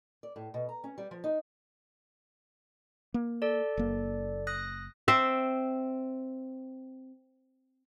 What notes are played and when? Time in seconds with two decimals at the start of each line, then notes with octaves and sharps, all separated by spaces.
0.23 D5
0.36 A2
0.54 B2
0.69 A#5
0.84 C#4
0.98 G3
1.11 F3
1.24 D#4
3.14 A#3
3.42 A4 D5
3.77 F#1 A#3
4.47 D#6 F#6 A#6
5.08 C4 E5